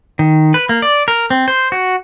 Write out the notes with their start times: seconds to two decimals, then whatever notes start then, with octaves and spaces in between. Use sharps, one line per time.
0.19 D#3
0.54 B4
0.69 A#3
0.82 D5
1.08 A#4
1.30 C4
1.48 C5
1.72 F#4